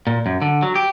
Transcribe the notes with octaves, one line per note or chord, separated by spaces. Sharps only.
A#2
F#2
D3
F#3
G4